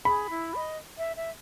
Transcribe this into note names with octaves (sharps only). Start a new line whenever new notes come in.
G#4 B5
E4
D#5
E5
E5